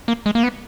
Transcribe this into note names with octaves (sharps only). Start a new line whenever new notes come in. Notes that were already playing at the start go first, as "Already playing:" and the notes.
A#3
G#3
A#3
B3